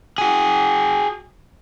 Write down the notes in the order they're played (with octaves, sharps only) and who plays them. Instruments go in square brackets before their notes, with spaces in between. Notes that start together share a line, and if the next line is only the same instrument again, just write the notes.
[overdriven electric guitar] F#4 G#4